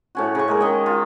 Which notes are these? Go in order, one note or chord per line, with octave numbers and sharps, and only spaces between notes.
A2 C#4 F#4
C#3 C#6
G#3 A#3 A#4
D#3 D#5
F4